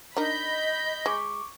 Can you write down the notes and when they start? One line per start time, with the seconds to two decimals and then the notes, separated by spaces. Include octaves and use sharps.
0.16 D4 D#4 A#4 D#5 B5 G6
1.06 G#3 C#6 D6